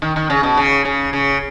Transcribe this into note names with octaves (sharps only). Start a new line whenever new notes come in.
D#3
D#3
C#3
B2
C#3
C#3
C#3